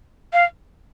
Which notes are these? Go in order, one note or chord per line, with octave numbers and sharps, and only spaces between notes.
F5